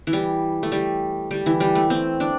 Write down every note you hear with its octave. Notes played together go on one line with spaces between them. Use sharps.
E3
G3
A3
G3
G3
E3
G3
A3
C4
D4